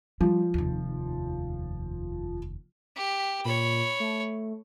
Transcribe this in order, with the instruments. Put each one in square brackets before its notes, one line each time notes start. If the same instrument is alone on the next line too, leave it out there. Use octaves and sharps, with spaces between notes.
[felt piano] F3 [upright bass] G3
[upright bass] F1 D#2
[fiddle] G4 [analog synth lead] B6
[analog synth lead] A#2 [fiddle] C#5 B5
[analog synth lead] A3